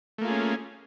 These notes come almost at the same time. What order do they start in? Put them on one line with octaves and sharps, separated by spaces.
A3 A#3 F4 G#4 C#4